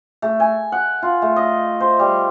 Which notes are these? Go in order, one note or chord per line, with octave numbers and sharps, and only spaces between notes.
A3
G#5
F#5
F4
A3
D#5
C5
G3